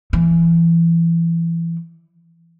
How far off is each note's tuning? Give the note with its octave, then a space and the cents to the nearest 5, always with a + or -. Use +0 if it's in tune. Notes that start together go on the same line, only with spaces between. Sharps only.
E3 +25